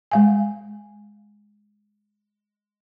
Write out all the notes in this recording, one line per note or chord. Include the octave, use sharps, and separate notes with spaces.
G#3 F5 G#5